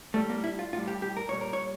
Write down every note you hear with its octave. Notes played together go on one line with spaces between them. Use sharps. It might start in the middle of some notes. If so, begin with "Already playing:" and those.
A2 G3 A3
A#3
E4
F4
A2 G3 F4
G4
G4
A#4
A#2 G3 C#5
A#4
C#5